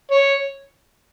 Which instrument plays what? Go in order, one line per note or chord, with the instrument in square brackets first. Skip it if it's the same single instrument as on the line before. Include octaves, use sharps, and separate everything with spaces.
[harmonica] C#5